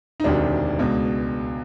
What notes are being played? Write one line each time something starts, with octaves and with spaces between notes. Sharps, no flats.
D#4
E1 D2 C3 D#3 D4
C#2 B2